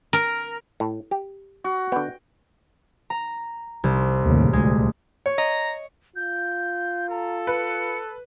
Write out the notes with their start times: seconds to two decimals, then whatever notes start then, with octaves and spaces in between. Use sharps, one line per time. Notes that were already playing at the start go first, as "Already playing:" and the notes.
0.13 A#4
0.80 A2
1.11 G4
1.64 F#4
1.92 D3 B3 G5
3.10 A#5
3.84 C2
4.23 D#2 A2 C#3
4.53 D2 A#2 G#3
5.26 C#5
5.38 D#5 A#5
6.16 F4 G6
7.09 A4 A#5
7.47 B4 C#7